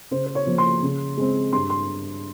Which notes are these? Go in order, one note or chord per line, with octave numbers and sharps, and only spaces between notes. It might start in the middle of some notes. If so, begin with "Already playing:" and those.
C#3 C5
C5
C#5
F3 A#3
C6
C#3
G#3 C4
G2 C6
C6